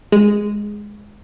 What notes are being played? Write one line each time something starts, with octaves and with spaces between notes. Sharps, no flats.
G#3